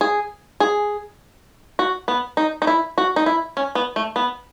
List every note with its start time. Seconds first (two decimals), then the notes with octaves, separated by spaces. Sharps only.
0.01 G#4
0.60 G#4
1.79 F#4
2.08 B3
2.37 D#4
2.62 D#4
2.67 E4
2.98 F#4
3.16 D#4
3.26 E4
3.57 C#4
3.75 B3
3.96 A3
4.16 B3